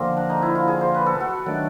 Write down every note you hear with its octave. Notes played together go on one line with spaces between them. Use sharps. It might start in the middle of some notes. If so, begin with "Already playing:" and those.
Already playing: D3 F3 A#3 C4
D4
D#4
E4
F4
G#4
C5
B4
A4
F#4
D#3 F#3 A3 D4